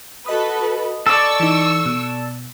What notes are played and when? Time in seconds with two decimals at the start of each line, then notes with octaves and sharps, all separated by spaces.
0.26 F#4 A4 B4 D#5 B5 D#6
1.06 A4 D5 C#6 E6
1.40 E3 D#4
1.86 B2